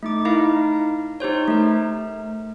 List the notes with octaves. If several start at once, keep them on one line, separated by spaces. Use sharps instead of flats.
A3 D#4 D6
D#4 E4 A#4 F5
D#4 G4 C5 C#5
A3 A#4